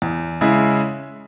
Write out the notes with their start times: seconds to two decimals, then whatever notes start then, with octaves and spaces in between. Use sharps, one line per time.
0.02 E2
0.41 C#3 G#3 E4